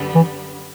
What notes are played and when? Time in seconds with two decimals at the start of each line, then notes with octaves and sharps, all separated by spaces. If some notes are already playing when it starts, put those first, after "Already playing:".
Already playing: F#2 D3 G3 B3
0.15 E3